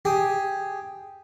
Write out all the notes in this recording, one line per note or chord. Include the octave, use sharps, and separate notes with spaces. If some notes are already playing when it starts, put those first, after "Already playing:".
G4 G#4